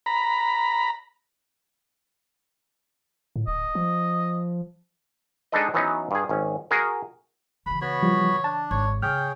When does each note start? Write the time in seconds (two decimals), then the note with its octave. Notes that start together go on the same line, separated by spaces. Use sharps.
0.06 A#5 B5
3.36 A2
3.47 D1 D#5
3.75 F3
5.52 G#3 D4 D#4 A4 B4 D#5
5.74 E3 F#3 B3 C#4 D#4
6.11 G2 G#4
6.29 G#1 C#4
6.71 F#4 G#4 A#4
7.66 C#3 E3 B5
7.81 B3 F#4 C#5 B5
8.03 F3 G3
8.44 D4 A5
8.71 G#1 C#5
9.02 C#3 C4 G#4 C#5 G5 F6